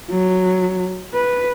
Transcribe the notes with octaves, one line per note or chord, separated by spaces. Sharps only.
F#3
B4